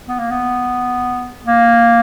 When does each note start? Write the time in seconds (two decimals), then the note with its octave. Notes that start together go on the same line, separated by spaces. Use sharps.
0.08 B3
0.19 A#3
0.31 B3
1.47 A#3